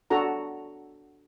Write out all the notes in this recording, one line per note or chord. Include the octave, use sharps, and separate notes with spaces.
D4 F#4 A4 A#5